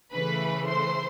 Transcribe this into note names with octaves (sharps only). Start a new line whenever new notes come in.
C#3 E3 A3 B4 B5
C5 C6